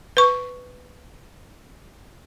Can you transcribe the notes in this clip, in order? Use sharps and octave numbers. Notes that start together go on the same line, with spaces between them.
B4 C#6